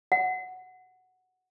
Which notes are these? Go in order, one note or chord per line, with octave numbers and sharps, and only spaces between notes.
F#5